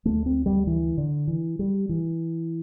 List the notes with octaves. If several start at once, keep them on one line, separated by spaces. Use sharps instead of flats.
D2 D3 A3
C4
G3
E3
D3
E3
G3
E3